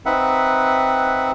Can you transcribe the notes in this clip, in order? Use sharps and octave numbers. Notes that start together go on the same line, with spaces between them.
C4 D#4 B4 E5 F#5